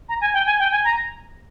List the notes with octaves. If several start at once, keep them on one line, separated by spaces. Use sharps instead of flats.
A#5
G#5
G5
G#5
G5
G#5
A#5